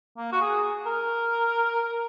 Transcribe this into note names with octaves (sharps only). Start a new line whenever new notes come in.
A#3
F#4
G#4
A#4